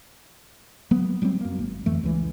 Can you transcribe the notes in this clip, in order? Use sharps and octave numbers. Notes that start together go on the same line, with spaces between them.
F#3 A#3 B3
F#3 G3 A#3 C4
F#2 A#3
G#1
F2 E3 A3
C#2 E3